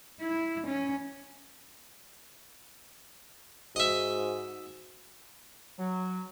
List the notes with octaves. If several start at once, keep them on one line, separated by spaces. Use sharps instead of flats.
E4
C#4
G#2 F#4 D#5 E5
F#3